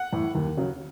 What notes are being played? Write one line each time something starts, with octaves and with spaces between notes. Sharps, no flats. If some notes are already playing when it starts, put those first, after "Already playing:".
Already playing: F#5
A2 E3
D#2
C#3 F#3